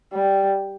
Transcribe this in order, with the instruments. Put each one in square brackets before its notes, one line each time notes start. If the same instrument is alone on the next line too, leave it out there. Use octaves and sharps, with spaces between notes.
[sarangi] G3